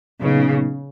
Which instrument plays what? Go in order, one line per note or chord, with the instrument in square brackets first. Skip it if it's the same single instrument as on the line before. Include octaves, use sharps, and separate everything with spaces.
[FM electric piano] A#2 F#3 B3 D#4 [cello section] C#3